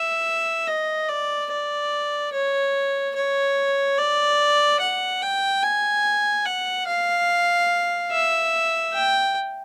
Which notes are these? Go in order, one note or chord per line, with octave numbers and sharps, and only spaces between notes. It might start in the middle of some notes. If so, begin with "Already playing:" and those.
Already playing: E5
D#5
D5
D5
C#5
C#5
D5
F#5
G5
G#5
F#5
F5
E5
G5